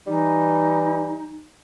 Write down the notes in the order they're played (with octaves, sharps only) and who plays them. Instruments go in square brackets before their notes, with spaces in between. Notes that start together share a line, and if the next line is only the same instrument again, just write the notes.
[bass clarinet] E3 [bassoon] G3 [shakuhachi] D#4